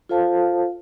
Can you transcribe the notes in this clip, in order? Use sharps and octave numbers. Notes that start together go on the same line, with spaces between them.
F4 A4 C5 F5 A5